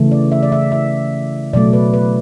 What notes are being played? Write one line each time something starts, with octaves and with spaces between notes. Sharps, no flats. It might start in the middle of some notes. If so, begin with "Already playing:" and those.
Already playing: C#3 E3 A3
D5
E5
D5
E5
E5
B2 F#3 A3 D5
B4
B4